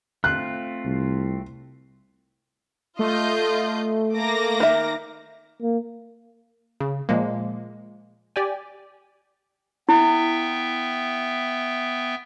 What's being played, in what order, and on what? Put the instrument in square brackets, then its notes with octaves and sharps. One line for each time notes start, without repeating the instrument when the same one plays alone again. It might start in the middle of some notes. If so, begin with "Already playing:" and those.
[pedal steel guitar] A3 C4 F4 [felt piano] F#6
[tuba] C2
[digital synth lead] A3 [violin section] F4 D#5 G6
[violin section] A#3 D6 A#6
[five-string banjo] D#3 E5
[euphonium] A#3
[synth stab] C#3
A#2 F3 G#3 A#3
G4 D5 G5 G#5
[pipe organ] B3 E5 G5 [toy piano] E4